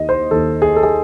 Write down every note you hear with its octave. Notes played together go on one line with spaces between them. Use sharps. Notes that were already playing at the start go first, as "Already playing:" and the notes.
Already playing: D#2 D#3 D#5
C5
D#2 D#3 A4
G#4
A4
G#4